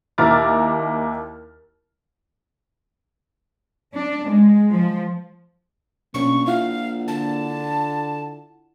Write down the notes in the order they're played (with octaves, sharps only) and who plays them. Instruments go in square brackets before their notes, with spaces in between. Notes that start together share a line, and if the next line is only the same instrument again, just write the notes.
[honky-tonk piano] D#2 E4 A#5 D6 F6 A6
[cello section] D4
G#3
F3
[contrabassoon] A#1 [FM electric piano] B2 C#4 [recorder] C#6
[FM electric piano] E4 F4 F#5 [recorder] F5
[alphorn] D3 [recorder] A5